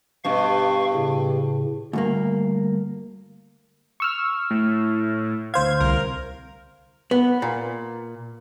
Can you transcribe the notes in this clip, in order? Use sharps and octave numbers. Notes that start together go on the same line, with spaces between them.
G2 B2 F5 C#6
A2 C#3
D2 G2 A#3
C#6 E6 F6
A2
D2 C5 F5 G#6
C2 A#4
B3
A#2